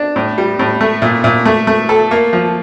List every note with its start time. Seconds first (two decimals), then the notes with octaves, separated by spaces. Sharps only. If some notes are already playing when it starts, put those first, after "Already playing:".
Already playing: D4
0.16 A2
0.38 G3
0.59 A2
0.81 A3
1.02 A#2
1.24 A#2
1.46 A3
1.67 A3
1.89 A4
2.11 A#3
2.33 F3